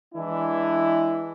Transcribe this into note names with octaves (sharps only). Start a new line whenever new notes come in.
E3 G#3 D4 E4